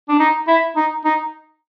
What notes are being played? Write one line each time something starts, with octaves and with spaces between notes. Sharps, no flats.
D4
D#4
E4
D#4
D#4